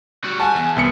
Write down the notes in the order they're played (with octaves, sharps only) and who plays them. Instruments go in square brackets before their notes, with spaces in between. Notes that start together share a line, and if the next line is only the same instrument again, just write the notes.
[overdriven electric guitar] G3 F#4
[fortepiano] F#5 A5 [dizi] G#5
[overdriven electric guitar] E2
[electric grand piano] C2 B3 C#7